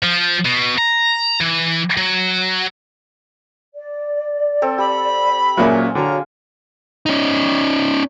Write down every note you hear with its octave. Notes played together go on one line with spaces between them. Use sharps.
F3
B2
A#5
E3
F#3
D5
C4 A4
G4 B5
A#2 F#3 C#4 F4 G#4 A#4 E5
D3 F#4 C#5 A#5
C#4 D#4